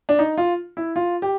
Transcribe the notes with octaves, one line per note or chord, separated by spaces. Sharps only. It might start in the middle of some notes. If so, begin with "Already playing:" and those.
D4
D#4
F4
E4
F4
G4